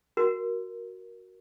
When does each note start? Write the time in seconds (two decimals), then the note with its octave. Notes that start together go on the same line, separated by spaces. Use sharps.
0.17 F#4 A#4